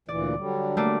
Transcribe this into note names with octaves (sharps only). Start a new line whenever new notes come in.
D2 A#2 E3 D5
D3 F#3 G3
A3 A#3 D5